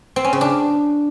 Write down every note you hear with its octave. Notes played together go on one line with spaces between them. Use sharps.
C4
C#4
C#3
D4